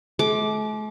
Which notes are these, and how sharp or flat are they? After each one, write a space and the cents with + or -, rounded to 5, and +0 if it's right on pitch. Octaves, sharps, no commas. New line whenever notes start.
A3 -45 D6 +0